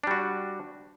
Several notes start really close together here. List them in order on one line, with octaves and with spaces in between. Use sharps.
D4 G3 F#4